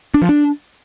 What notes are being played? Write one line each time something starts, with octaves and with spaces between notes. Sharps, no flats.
D4
F3
D4